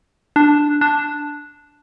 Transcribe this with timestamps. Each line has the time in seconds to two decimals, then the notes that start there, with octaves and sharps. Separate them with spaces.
0.36 D4
0.81 D4